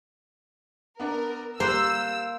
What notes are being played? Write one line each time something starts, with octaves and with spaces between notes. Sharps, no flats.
B3 D4 A#4
G3 A#3 C5 E6 F#6